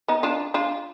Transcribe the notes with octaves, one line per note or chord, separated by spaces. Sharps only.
B3 D#4
D4 F4
D4 F4